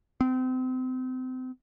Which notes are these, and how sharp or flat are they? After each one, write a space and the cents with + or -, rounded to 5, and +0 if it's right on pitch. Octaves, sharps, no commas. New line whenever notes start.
C4 -35